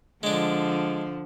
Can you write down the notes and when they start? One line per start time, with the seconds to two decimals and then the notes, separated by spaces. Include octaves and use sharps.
0.23 D3 F3 G#3 D4